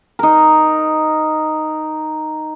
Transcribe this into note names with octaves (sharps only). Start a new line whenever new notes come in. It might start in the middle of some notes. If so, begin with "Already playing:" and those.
D#4 A#4